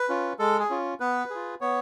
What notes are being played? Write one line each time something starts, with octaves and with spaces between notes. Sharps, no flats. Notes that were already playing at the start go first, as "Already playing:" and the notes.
Already playing: B4
C#4 F4
G#3 A4
G#4
C#4 F4
B3 B4
F4 G#4
B3 C#5